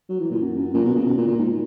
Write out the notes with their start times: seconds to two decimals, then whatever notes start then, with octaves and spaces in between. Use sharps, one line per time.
0.09 F#3
0.20 E3
0.31 A#2
0.41 F#2
0.58 F#2
0.74 A#2
0.85 B2
0.96 C#3
1.06 B2
1.17 A#2
1.28 A#2
1.39 G#2